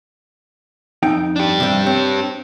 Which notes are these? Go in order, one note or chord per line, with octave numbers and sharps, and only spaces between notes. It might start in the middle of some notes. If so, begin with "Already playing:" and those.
F2 D#4 G5
D4 G4
C3 F3 G3
C4 C#5